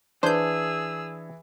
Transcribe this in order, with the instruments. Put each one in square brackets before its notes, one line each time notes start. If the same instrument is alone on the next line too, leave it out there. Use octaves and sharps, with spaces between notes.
[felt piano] E3 [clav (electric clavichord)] D4 [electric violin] G#4 E6 [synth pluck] C5 G6